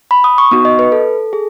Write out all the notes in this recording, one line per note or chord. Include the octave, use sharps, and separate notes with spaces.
B5
D#6
C#6
B3 D#4 F#4 C#6
D#5
B4
A4
G#4